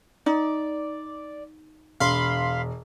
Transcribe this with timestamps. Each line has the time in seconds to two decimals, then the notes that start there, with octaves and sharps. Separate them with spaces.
0.26 D#4 D5
2.00 E1 F5 B5 C6